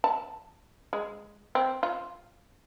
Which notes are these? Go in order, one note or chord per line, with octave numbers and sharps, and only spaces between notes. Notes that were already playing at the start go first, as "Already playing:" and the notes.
A5
G#3
C4
F4